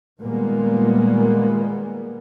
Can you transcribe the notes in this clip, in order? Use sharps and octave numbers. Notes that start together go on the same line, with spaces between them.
A#2 D#3 G3 G#3 A#3 B3